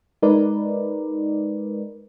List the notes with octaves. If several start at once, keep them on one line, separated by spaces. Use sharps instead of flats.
G#3 D#4 A#4 B4 D5